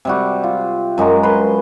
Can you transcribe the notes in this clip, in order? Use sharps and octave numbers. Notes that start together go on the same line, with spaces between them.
C3 G3 F#4
F4
F#2 G#3 F#4 A#5
B4 C6